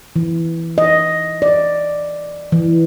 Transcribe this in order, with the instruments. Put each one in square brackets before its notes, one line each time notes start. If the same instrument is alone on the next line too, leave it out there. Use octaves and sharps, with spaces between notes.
[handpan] E3
D#5
D5
E3